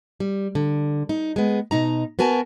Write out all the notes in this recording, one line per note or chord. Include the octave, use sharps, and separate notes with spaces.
G3
D3
D#4
G#3 B3
B2 D#4 A#5
B3 F#4 A#4 G#5 A5